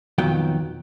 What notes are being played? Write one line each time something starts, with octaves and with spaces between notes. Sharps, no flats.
B1 F2 D#3 F#3 B3 G5